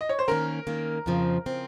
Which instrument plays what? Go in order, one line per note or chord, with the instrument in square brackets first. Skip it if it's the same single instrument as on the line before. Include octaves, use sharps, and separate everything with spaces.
[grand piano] D#5
C#5
C5
[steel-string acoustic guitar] D#3 A#3 C#4 [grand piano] A#4
[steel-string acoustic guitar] D#3 A#3 C#4
F2 C#3 F3 C4
C#3 F3 C4